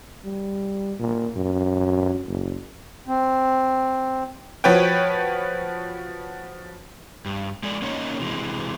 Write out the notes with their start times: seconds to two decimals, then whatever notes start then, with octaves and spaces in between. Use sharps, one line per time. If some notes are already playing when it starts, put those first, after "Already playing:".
0.25 G3
0.99 A#2
1.37 F#2
2.27 F#1
3.07 C4
4.64 F3 F#4 B4 C#5 G5
7.26 G2
7.63 G#3 A4 D5
7.82 A#3 C#4 D#4 B4 C#5 D#5
8.19 C3 E3 G#3